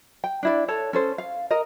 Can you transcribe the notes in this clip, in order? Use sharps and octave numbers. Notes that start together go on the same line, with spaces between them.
G5
D4 E4 D5
A4 C#5 A5
C#4 A4 C5
F5
A#4 D#5